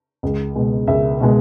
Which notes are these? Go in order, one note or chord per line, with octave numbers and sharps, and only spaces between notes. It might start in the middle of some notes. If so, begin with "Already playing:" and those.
C#2
B2 G#3
C#2 E5
B2 G#3